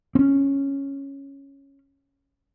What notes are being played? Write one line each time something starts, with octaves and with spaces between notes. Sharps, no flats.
C4 C#4